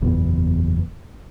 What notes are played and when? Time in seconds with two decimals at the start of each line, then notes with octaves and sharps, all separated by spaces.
0.01 F#1 E2 A#2 B3